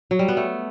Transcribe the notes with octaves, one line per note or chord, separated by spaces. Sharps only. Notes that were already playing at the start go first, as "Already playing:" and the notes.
F#3
G3
B3
A3